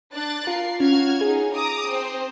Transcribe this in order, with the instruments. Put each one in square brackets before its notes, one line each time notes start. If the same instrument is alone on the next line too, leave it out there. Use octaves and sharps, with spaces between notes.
[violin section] D4 F#6 A6
[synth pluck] F4 [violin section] A#4 C7
[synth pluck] C#4 [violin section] F#4 F6 G#6
[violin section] C#4 D#4 [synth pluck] G#4
[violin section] A#5 D6 D#6
C4 C5